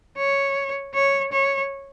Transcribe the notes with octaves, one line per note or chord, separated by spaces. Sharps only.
C#5
C#5
C#5